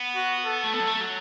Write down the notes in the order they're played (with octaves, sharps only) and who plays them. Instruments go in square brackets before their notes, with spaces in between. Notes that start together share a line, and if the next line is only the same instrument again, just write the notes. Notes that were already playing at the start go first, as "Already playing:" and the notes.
Already playing: [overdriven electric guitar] B3
[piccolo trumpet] F#4
A4
[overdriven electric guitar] A3
[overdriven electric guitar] B3 [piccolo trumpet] A4
[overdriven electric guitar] F#3
A3
F#3